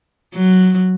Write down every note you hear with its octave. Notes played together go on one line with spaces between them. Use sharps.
F#3